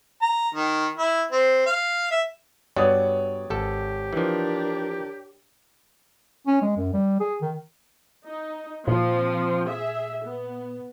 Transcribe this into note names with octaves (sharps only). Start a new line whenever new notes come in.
A#5
D#3
E4
C4
F5
E5
G2 F#3 B3 C#5 D5 D#6
G#1 G4 A4
E3 F3 D4 A#4
C#4
G#3
F#2
G3
G#4
D#3
D#4
A#2 F3 C4
G#4 E5
B3